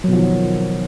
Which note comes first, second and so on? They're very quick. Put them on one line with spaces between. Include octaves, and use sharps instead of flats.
F#3 B2 F3 D#3